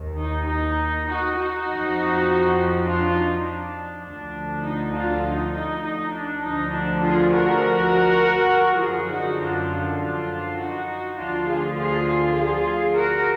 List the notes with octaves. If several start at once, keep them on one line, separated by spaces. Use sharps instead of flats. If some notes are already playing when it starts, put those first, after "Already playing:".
Already playing: D#2 D#3
D#4
D#4
D#4 F#4
D#4 F#4
F2 F3
D4 F4
D#4
D4
D2 D3 F3 D4
D#4
D4 F4
D#4
D#4
D#4
D4
D2 D3 F3 D#4
D4
F4 G#4
F#4 A#4
F#2 D3 F3 F4 G#4
D#4 F#4
D4 F4
D4 F4
D#4 F#4
D2 D3 F3 D4 F4
F4 G#4
F4 G#4
F4 G#4
F#4 A#4